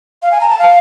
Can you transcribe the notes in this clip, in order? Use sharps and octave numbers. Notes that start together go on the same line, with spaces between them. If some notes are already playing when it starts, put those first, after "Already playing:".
F5
G#5
A#5
A5
F5